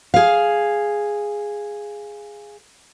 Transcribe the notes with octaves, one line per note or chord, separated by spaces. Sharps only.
G#4 F5